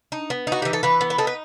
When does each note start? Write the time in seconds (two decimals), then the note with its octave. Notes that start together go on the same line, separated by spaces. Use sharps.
0.12 D#4
0.30 B3
0.47 D#4 F#4
0.62 E3 G4
0.73 A4
0.83 E3 B4
1.01 B3
1.10 B4
1.18 D#4 A4
1.27 B4